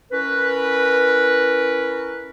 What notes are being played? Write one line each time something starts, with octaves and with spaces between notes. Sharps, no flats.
C#4 E4 A#4 B4